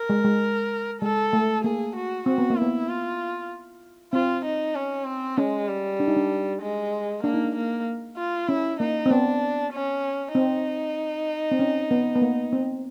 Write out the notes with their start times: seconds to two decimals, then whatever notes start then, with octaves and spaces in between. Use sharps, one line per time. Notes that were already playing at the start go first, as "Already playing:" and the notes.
Already playing: A#4
0.10 G#3
0.25 G#3
1.02 G#3 A4
1.33 A3
1.64 A#3 G#4
1.96 F#4
2.26 C4 F#4
2.38 B3
2.50 A#3
2.58 B3 E4
2.89 F4
4.13 C4 F4
4.45 D#4
4.75 C#4
5.07 C4
5.38 G#3 C#4
5.69 G3
6.00 D4
6.08 D#4
6.16 D4
6.62 G#3
7.23 A#3 D4
7.34 D#4
7.44 D4
7.55 A#3
8.17 F4
8.48 C#4 E4
8.80 A#3 D#4
9.06 C4
9.11 B3 D4
9.73 C#4
10.35 C4 D#4
11.51 C4
11.59 C#4
11.91 B3
12.15 B3
12.22 A#3
12.53 C4